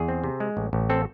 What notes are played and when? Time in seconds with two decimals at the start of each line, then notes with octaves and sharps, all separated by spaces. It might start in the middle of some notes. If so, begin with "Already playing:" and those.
Already playing: E2 G#4
0.08 C4
0.24 C3
0.40 G#3
0.57 A1
0.73 A1
0.90 C4 A4